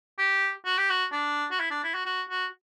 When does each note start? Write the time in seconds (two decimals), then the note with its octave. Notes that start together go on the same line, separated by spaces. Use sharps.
0.19 G4
0.65 F#4
0.78 G4
0.89 F#4
1.12 D4
1.51 F#4
1.60 E4
1.71 D4
1.83 E4
1.94 F#4
2.06 F#4
2.29 F#4